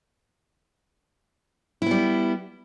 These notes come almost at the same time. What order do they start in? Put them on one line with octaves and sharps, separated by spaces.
E4 B3 G3